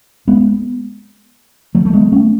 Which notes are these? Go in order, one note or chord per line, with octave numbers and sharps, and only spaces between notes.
G#3 B3
F#3 A3
A3
G#3 B3
A3 C#4